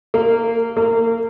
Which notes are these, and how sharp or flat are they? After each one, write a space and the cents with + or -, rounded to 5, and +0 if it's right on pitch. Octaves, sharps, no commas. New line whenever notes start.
A#3 -20
A#3 -30